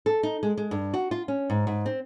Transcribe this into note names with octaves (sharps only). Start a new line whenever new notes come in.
A4
D#4
G#3
G#3
G2
F#4
F4
C#4
G#2
G#2
C4